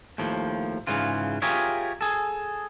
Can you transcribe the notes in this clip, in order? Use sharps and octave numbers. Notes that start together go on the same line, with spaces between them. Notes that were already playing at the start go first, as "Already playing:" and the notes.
D#2 A2 F3
G#2 C#3 E3 F4
F4 G4 G#4 A#4 C#5 E5
G#4 A4